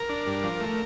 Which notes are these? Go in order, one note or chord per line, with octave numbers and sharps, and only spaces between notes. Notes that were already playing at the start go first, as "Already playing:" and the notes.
Already playing: A#4
D4
G2
F3
A3